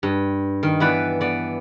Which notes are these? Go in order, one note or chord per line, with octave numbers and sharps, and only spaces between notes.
G2
D#3
E3 B3 B4 D5
B3 D5